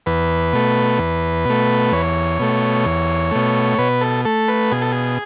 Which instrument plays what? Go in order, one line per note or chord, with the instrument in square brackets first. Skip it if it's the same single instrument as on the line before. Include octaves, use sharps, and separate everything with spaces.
[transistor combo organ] E2 B4
B2 A3
E2
B2 A3
E2 C#5
B2 A3
E2
B2 A3
B2 B4
A4
A3 A4
B4
B2 G#4
A4
G#4